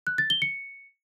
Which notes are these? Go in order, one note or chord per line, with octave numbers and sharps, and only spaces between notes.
F#6
A6
G7
C#7